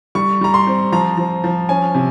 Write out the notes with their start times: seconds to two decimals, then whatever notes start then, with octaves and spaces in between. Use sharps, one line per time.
0.15 G3 C#6
0.41 G3 A#5
0.54 C6
0.67 C4
0.92 F3 A#5
1.18 F3
1.44 F3
1.69 C#4 G#5
1.94 C3